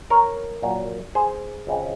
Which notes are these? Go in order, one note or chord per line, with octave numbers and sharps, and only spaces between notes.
A#4 C#5
A#2 F#3 A#3
G#4 C5
C#2 C#3 G#3 C4